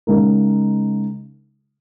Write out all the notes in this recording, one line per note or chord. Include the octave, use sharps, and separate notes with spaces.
C#3 G#3 D#4 A#4